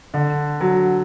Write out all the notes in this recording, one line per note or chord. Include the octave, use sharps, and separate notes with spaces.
D3
F#3